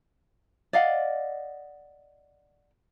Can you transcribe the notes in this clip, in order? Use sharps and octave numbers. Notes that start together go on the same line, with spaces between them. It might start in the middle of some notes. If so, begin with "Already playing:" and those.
D5 D#5 F5 F#5